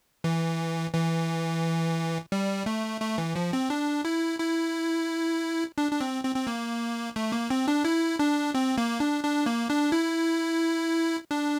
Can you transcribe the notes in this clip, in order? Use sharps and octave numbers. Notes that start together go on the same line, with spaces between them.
E3
E3
G3
A3
A3
E3
F3
C4
D4
E4
E4
D4
D4
C4
C4
C4
A#3
A3
A#3
C4
D4
E4
D4
C4
A#3
D4
D4
A#3
D4
E4
D4